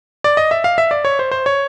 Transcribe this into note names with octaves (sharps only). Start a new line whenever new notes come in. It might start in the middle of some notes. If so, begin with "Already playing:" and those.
D5
D#5
E5
F5
E5
D5
C#5
C5
C5
C#5